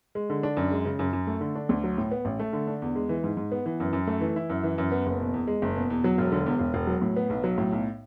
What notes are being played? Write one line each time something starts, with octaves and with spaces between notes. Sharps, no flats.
G#3
D3
D4
F#2
G#3
C#3
F#2
F#2
A3
D3
D4
D2
F#3
A2
B3
A1
A3
D3
D4
E2
G#3
E3
G#2
G#2
B3
E3
F#2
F#2
A3
E3
E4
F#2
E3
F#2
B3
F#1
B2
E2
G#3
F#1
B2
E2
F#3
E1
D3
E2
E1
E1
F#3
A2
B3
B1
F#3
A2
B1